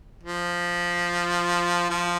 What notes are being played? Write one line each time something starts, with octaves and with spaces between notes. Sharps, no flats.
F3
F3